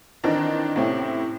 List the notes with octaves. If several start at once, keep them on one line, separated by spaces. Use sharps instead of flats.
D#3 E3 C4 D4 D#4
A2 C3 C4 C#4 E4